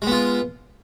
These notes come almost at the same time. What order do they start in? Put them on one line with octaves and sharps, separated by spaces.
G#3 B3 F4